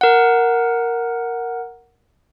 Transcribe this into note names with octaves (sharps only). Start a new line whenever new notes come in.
A#4 F#5